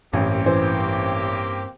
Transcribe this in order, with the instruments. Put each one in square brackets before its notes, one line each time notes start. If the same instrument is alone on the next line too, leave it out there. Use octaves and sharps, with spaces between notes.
[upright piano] A1 [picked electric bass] G2 C#4 [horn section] A#3 C4 G4
[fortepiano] E3 C5